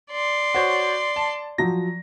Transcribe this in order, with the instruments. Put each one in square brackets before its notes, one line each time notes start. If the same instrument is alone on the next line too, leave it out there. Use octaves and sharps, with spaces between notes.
[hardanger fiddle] D5 C6
[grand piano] F#4 C5 C#5
A5
[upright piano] F3 F#3 [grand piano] A#6